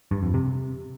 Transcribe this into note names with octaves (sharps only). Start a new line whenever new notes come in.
G2
F2
C3